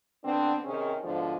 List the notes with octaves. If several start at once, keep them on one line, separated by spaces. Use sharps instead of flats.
D3 B3 C4 D4
C3 D#3 C#4 G#4
G#2 B2 D3 F3